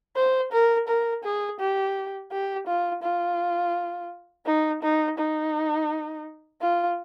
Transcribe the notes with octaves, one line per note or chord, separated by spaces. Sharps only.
C5
A#4
A#4
G#4
G4
G4
F4
F4
D#4
D#4
D#4
F4